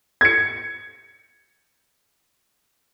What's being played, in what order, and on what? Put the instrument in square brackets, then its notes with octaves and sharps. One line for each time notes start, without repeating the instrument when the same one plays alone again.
[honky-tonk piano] G#6 C#7